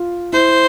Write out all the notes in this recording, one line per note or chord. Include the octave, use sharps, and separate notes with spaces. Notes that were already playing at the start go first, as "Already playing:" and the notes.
Already playing: F4
E4 C5